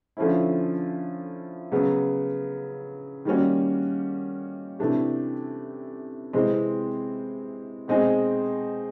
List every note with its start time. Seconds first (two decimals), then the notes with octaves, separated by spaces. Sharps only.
0.17 D3 F3 A3 C#4 E4
1.72 C#3 F#3 B3
3.25 D#3 G3 A#3 C#4 F#4
4.79 C3 E3 A3 D4 G4
6.33 C3 E3 G#3 C4
7.88 B2 G#3 C4 D#4 G#4